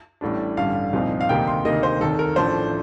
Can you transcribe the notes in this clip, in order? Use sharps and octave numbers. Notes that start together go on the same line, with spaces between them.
A1 A2 G3 D4
A1 G2 D3 G3 F5
C2 A#2 F3 C4 D#4
F5
D2 C3 D#3 A#3 D#4 G5
C6
D2 C3 D#3 A#3 D#5
C5
F1 D#2 D#3 A4
A#4
A1 A2 F3 A3 D4 C5